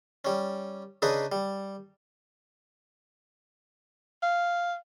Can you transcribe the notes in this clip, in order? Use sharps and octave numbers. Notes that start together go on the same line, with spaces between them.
G3 C#4
C#3 D4 D#4 G#4 B4
G3
F5